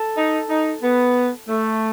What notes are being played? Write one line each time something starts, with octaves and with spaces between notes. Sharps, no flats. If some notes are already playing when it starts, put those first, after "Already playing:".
Already playing: A4
D#4
D#4
B3
A3